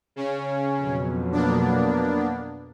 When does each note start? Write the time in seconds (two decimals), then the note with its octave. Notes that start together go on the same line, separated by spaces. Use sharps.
0.16 C#3 C#4
0.77 F2 B2 F#3
1.32 A#3 B3 D4